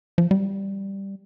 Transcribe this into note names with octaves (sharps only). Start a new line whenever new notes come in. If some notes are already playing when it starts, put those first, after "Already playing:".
F3
G3